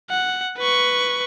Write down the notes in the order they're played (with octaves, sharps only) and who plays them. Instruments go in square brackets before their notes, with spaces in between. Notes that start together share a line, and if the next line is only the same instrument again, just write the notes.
[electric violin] F#5
B4 C#6